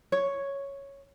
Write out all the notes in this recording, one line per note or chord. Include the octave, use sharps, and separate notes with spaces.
C#5